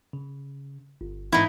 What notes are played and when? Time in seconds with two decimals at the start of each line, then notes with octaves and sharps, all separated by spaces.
0.13 C#3
1.01 G1
1.32 G#2 E3 D#4 E4